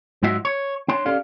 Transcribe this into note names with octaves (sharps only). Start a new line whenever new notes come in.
G#2 F#3 F4 F#4 D#5 E5
C#5
D4 C#5 C6
C#4 G4 A4 D5 F5